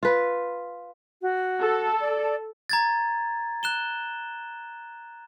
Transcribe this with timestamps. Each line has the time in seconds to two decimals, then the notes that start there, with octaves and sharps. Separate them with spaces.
0.03 F4 B4
1.22 F#4
1.61 A4
2.01 D5
2.70 A#5 G#6 A6
3.63 F#6 E7 G7